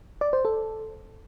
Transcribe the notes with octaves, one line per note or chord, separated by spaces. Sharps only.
D5
C5
A4